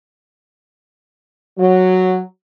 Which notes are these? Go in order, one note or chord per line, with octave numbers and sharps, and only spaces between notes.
F#3